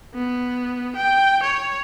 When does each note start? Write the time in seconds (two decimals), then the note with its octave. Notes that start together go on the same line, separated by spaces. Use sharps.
0.14 B3
0.96 G5
1.43 C#5